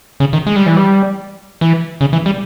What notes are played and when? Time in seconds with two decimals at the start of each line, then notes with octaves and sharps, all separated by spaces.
0.20 C#3
0.33 D#3
0.46 G#3
0.56 G3
0.66 E3
0.77 G3
1.61 E3
2.01 C#3
2.13 E3
2.26 G3